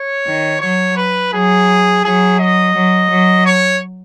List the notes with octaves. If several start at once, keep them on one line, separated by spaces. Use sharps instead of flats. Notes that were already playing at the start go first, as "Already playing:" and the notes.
Already playing: C#5
D#3
F#3 C#5
B4
F#3 G#4
F#3 G#4
D#5
F#3
F#3
C#5